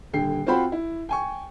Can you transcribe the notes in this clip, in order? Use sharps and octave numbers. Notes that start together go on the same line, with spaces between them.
D#1 D3 G5 C7
C4 F4 F#4 C5 G5 B5
E4
G5 G#5 C#6